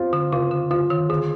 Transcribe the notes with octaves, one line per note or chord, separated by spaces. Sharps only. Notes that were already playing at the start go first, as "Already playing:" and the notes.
Already playing: C4 F4
D3
C#3 F4
D3
D3 F4
D#3
D3 G#4